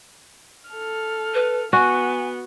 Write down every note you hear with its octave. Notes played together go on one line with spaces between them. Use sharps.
A4 F6
B4
B3 F#4 G#5